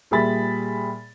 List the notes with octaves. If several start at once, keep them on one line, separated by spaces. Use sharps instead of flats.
A#2 G3 G#4 E5 B5 A6